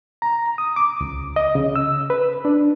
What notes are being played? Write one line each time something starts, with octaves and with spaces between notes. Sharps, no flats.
A#5
D#6
D6
C#2
D#5
C#3
E6
B4
D4